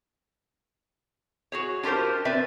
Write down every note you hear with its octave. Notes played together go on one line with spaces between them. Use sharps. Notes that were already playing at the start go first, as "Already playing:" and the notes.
F#4 G#4 C#5
D4 F4 G4 A#4 C5
C4 B4 D5 E5